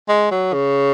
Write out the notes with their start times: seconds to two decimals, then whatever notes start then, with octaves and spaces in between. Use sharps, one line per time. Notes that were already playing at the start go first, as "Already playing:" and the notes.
0.09 G#3
0.31 F#3
0.54 C#3